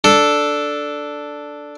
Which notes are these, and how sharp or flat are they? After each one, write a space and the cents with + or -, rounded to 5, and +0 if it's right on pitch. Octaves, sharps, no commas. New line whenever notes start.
D4 +0 A4 +0